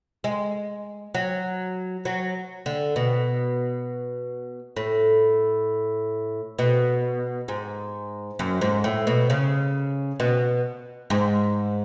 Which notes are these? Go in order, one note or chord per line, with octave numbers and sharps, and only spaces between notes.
G#3
F#3
F#3
D3
B2
A2
B2
G#2
F#2
G#2
A2
B2
C#3
B2
G#2